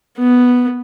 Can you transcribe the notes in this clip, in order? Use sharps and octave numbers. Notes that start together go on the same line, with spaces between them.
B3